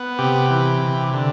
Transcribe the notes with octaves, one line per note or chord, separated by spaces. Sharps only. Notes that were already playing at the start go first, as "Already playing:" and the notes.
Already playing: B3
C3 G4
E3
C3
D3